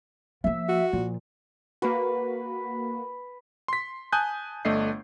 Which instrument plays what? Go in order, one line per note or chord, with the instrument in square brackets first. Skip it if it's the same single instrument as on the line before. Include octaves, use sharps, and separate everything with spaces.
[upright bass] F3 A#3 [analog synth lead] E5
[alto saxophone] F#4
[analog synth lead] A#2 [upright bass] F3
[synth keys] A#3 F#4 [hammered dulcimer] B4
[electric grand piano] C6 B6
G#5 A5 D#6 F#6 G6
G1 A3 D4 D#5 C7